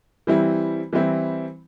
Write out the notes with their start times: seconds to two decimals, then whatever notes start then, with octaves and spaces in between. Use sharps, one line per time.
0.27 E3 G3 C4 E4
0.93 E3 G3 C4 E4